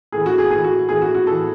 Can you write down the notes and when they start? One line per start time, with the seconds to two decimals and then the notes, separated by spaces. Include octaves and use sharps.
0.12 A2 E3 G#4
0.26 F#4
0.38 G#4
0.51 A2 E3 G#4
0.64 F#4
0.89 A2 E3 G#4
1.02 F#4
1.15 F#4
1.27 A2 E3 A4